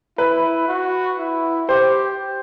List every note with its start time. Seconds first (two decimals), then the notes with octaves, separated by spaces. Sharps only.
0.18 E4 B4
0.68 F#4
1.19 E4
1.69 G4 C5